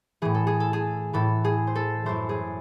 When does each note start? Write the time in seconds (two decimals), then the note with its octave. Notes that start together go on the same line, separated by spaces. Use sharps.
0.22 A2 E3 G#4
0.34 A4
0.47 G#4
0.60 A4
0.73 G#4
1.13 A2 E3 A4
1.45 G#4
1.67 C5
1.75 A4
2.06 F#2 E3 C5
2.29 G#4